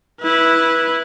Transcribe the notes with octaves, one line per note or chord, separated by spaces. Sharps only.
E4 B4